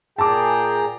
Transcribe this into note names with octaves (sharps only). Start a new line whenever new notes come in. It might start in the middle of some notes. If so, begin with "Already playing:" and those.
A#2 G#4 G5 A5 A#5 D6